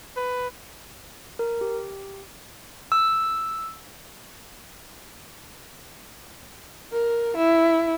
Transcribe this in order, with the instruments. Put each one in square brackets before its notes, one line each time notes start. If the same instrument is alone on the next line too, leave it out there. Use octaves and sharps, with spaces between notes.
[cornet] B4
[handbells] A#4
G4
E6
[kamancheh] A#4
E4